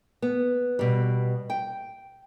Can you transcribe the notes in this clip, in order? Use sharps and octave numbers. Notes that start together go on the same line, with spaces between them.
B3
B2 G3
G5